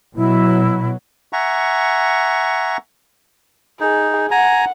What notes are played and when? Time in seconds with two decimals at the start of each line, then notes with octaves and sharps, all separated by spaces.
0.15 B2 F#3 E4
1.33 E5 F#5 G#5 A#5 C#6
3.80 D#4 G#4
4.31 F#5 G#5 A#5